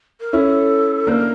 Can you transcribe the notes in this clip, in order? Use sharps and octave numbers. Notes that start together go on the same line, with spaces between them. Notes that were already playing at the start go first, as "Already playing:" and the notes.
A#4
C#4 E4 A4
A#3 D4 C5
A#4